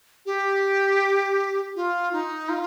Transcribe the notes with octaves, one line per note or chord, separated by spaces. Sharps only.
G4
F4
D#4
F4